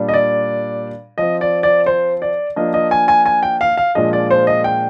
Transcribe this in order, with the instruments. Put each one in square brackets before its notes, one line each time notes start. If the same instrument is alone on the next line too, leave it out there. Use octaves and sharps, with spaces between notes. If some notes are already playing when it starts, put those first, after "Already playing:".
Already playing: [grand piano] A#2 G3 D4
D#5
D5
F3 C4 D#5
D5
D5
C5
D5
F3 A#3 D4 D#5
D#5
G#5
G#5
G#5
G5
F5
F5
A#2 F3 G#3 D4 D#5
D5
C5
D#5
G5